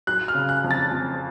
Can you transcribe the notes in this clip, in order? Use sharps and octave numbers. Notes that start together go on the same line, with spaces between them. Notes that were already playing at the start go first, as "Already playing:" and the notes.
F#3 F#6
F6
C#3
F#6
F2
A6
F2